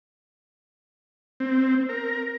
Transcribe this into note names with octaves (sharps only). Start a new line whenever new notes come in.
C4
A#4